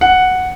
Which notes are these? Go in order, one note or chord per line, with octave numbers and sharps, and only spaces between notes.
F#5